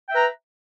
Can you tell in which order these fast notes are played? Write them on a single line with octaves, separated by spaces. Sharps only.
G5 E5 B4 A#5